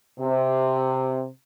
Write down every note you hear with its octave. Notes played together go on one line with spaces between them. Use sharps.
C3